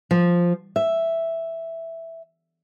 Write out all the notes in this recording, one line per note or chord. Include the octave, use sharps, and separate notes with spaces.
F3
E5